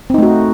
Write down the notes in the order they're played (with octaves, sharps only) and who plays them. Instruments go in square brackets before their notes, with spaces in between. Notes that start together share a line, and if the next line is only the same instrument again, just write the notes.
[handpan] C4
D#4
A3
F#4